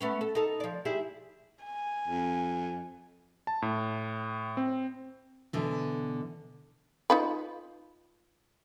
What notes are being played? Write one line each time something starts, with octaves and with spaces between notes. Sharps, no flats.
A3 B3 C#4
A4
D#4 A4
F3 D5
E4 G4 G#4
G#5
F2
A5
A2
C4
B2 D3 E3
D#4 F4 B4